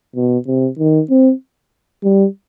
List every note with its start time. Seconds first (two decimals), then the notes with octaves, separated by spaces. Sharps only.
0.16 B2
0.47 C3
0.79 D#3
1.10 C4
2.04 G3